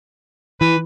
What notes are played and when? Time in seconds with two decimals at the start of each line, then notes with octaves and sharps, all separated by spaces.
0.61 E3 B4